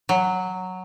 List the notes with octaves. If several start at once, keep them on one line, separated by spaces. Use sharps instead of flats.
F#3